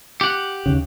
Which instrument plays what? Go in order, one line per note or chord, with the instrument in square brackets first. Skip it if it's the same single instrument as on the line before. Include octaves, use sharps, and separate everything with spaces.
[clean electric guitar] G4 F#5
[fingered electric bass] D#2 C#3